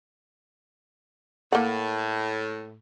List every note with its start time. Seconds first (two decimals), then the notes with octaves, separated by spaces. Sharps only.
1.52 A2 A#3 F#5